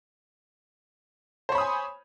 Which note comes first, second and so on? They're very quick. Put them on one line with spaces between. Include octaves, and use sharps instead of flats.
C5 C#5 B5 D#6 G#5